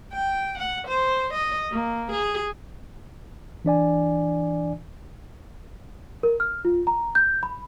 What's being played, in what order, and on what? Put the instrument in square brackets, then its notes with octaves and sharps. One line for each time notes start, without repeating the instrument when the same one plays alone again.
[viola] G5
F#5
C5
D#5
A#3
G#4
[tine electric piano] E3 D4 D5 G#5
[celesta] A#4
F6
F4
A#5
G6
B5